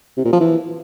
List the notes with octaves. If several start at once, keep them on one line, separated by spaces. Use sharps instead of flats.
C3
A#2
F3
E3